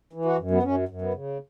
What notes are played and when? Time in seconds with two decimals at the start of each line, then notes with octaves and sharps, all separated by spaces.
0.13 E3
0.25 F#4
0.38 F#2
0.51 B3
0.63 F#2 C#4
0.89 F#2
1.02 B3
1.14 C#3